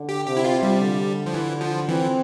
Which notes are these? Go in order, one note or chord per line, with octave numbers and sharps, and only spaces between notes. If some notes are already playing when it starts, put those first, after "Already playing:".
Already playing: D3
G4
C3 G4
E4
F4
G3
D3
F3
E3
F3
E3 C4